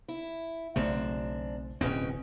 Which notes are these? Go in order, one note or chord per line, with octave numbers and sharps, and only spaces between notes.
E4
B1 F#2 C#3 A3 C4 D4
D1 B2 C4 C#4 G5